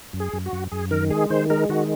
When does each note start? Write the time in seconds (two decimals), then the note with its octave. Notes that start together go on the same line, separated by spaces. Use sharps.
0.13 F#2
0.20 G#4
0.33 F#2
0.46 F#4
0.53 F#2
0.72 F#2 G#4
0.91 D#3 A#4
1.10 G#3 G#4
1.30 D#3 C5
1.50 G#3 A#4
1.69 D#3 F#4